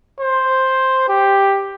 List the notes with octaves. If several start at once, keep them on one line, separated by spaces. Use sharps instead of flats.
C5
G4